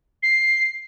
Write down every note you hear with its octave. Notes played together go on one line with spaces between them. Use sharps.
C7